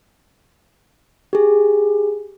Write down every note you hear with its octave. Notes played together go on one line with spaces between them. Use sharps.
G4 G#4